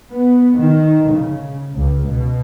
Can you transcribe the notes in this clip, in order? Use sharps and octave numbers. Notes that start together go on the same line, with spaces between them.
B3
D#3
C#3
C#2
B2